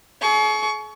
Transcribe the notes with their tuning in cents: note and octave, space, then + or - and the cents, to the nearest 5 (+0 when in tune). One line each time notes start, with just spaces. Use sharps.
G#4 +45 C#6 +25